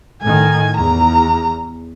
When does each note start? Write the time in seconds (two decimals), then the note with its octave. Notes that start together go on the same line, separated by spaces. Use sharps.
0.22 A2 D#3 G#5
0.77 E2 A#5